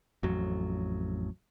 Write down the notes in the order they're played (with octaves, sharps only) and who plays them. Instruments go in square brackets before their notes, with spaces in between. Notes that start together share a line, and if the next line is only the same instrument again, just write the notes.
[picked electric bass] A1 F2 F#3